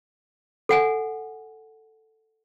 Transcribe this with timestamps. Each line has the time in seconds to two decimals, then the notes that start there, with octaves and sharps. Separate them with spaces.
0.69 A4 F#5 G#5